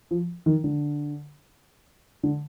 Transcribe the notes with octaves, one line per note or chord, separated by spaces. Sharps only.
F3
D#3
D3
D3